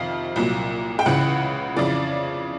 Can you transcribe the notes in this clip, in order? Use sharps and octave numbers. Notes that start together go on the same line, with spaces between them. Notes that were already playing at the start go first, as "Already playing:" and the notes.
Already playing: F2 C3 D#3 F5
C2 A#2 F#3
G5
C#2 C#3 E3 F#5
F2 C#3 E3 D5